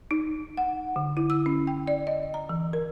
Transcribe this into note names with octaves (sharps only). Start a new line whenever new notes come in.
D#4
F#5
D3
E4
E6
C#4
G5
D5
D#5
A#5
E3
A#4